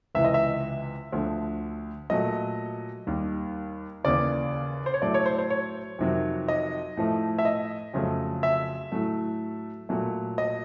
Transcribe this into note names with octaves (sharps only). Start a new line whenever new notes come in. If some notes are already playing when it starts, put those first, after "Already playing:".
C#2 C3 E3 E5
D#5
E5
D2 D3 F3
A#2 F#3 A3 D#5
D#2 D#3 G3
D#2 C#3 E3 D5
C5
C#5
A2 F#3 A3 D5
C#5
C5
C5
C#5
F2 C3 D#3 F#3
D#5
A2 F3 A3
E5
D#5
F2 C#3 F#3 A3
E5
A2 F#3 A3
A#2 F#3 A3
D#5